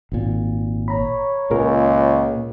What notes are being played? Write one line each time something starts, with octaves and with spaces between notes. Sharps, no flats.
G#1 A#2
C#5 A#5 B5
C#2 A#2 G#4 A#4